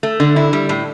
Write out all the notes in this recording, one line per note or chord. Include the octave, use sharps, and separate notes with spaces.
A3
D3
E4
G3
A2